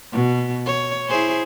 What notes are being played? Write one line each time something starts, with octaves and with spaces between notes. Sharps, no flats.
B2
C#5
E4 G#4 C5